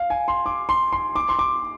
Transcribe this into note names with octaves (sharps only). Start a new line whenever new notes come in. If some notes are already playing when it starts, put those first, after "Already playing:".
Already playing: F5
G#5
C6
D6
C6
C6
D6
C6
D6